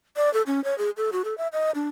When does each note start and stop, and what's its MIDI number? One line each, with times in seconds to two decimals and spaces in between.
0.17 0.32 74
0.34 0.42 69
0.47 0.63 61
0.64 0.77 73
0.78 0.90 68
0.97 1.10 69
1.12 1.22 66
1.25 1.36 69
1.38 1.48 76
1.53 1.71 75
1.75 1.89 62